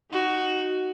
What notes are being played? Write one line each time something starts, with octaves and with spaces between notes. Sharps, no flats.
D#4 F#4